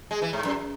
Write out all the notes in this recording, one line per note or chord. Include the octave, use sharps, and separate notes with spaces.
G#3
E3
G#2
F#2